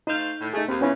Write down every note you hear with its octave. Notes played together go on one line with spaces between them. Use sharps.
A3 D#4 C5 F5 G6
A2
A3 D#4 G#4
D#2 C4
A#2 C#3 B3 C#4 E4